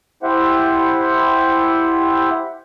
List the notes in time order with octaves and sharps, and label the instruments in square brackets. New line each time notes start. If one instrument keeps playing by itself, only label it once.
[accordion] E4 G4 C5 E5 F#5